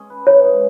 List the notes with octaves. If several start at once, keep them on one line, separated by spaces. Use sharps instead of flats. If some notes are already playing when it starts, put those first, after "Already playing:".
Already playing: G#3 C#4 G#4
B4
E3 C#5
G#2